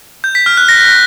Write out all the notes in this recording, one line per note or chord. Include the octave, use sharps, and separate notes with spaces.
G6
B6
F6
F#6
A#6